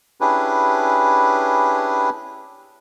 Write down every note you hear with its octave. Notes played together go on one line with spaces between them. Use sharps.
C#4 D4 E4 G4 G#4 B4